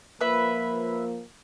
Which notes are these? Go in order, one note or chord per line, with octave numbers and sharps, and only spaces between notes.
F3 A#3 B4 E5